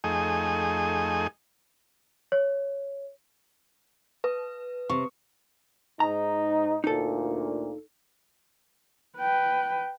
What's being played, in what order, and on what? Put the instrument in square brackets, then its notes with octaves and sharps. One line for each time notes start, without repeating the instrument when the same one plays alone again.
[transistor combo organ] F2 A3 D#4 G#4 G#5 D#6
[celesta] C#5
[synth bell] B4 [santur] D#6
[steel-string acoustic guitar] C3 [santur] C#6
[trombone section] G#2 D#4 [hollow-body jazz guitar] A#5
[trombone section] D2 A#2 [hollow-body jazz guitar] D#4 A4
[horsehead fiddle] B4 G5